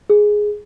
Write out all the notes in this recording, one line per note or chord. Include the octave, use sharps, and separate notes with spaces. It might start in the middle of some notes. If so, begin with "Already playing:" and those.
G#4